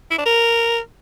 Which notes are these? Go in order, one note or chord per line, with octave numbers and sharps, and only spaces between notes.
E4
D4
A#4